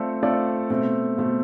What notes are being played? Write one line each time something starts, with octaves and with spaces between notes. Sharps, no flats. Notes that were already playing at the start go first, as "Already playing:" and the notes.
Already playing: A3 C4 F4 A4 D5
A3 C4 F4 A4 D5
B2 A3 C4
B2 A3 C4